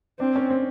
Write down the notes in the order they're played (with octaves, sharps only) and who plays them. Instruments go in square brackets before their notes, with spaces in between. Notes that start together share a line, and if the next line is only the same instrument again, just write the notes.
[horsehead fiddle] C4 [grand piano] D4
[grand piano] C#4
C4